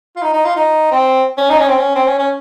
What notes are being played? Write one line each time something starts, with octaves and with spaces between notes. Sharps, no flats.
F4
D#4
D#4
F4
D#4
C4
C#4
D#4
C#4
C4
C#4
C4
C#4
C#4